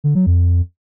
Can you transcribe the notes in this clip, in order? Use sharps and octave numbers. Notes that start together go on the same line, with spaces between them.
D3
F#3
F2